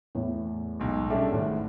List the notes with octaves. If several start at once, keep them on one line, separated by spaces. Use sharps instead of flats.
E2 A2
B1 G#3
G3 C#4 D4 G#4 A4 E5
G#1 A2